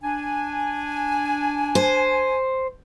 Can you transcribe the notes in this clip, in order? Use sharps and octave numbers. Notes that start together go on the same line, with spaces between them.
D4 G#5
C5